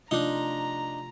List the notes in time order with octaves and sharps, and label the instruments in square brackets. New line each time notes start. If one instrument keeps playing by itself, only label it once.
[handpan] C3 A3 F4 [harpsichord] D4 D#4 [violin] A#5